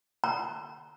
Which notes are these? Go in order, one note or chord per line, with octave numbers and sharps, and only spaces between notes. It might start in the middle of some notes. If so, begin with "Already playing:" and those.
A#5